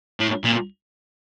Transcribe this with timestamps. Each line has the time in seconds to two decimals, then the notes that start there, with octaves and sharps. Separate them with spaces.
0.20 A2
0.44 A#2